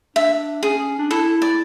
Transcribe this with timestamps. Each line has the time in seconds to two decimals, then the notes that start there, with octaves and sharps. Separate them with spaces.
0.16 D4 E5
0.63 C#4 G#4
0.98 D4
1.10 E4 A4
1.42 D5